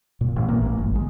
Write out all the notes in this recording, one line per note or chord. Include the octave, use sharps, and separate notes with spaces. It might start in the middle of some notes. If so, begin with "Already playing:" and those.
A#2
A1
A#3
A1
G1
G#3